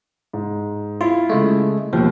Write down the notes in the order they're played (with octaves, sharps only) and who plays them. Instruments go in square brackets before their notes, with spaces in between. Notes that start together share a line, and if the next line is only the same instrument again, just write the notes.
[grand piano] G#2
[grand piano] E4 [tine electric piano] F4
[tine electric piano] C#3 G#3 A3
[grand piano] D#2 [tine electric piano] B2 F3